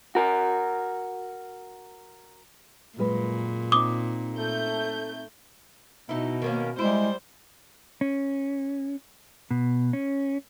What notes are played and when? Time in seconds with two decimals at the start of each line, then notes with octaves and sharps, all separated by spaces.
0.15 F#4 A#4
2.98 F#2 A#2 G#3 B4
3.72 C4 D#4 D6 D#6
4.37 A3 G6
6.09 B2 D#4 E4
6.42 D#3 A#3 C#4
6.79 G3 G#3 E4 C5
8.01 C#4
9.51 B2
9.93 C#4